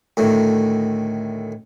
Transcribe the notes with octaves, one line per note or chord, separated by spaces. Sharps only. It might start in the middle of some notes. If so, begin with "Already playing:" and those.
D2 A2 D#3